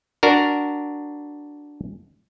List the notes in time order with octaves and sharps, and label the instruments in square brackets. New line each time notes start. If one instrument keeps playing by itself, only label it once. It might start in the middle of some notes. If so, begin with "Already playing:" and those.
[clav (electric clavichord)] D4 F#4 A#4